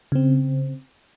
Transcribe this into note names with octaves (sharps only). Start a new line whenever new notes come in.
C#3 C4